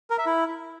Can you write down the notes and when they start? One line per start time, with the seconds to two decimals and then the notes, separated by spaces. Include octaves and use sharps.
0.10 A#4
0.18 E5
0.26 E4